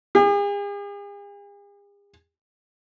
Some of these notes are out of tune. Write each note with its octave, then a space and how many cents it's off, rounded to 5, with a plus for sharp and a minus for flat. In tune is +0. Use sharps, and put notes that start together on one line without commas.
G#4 -45